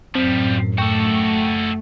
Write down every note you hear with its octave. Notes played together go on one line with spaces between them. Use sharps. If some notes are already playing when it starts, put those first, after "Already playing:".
F#2 A2 F3 G3 C4
A3 F#4 A4 G5 C#6